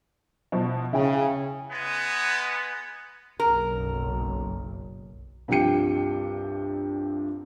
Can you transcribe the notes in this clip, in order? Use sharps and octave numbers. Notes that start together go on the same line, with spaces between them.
B2 F3 E4
C#3 E4 E5 G5
G#3 B3
F#1 B1 A#4
C2 G2 F3 G4 G5 C#7